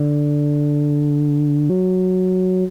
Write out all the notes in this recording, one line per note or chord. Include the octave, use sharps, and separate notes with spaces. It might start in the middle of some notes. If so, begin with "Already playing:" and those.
Already playing: D3
F#3